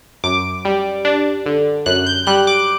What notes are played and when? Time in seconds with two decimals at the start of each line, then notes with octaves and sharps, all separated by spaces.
0.24 F#2 D6
0.65 G3
1.05 D4
1.46 D3
1.86 F#2 F#6
2.06 G6
2.27 G3 F#6
2.47 D6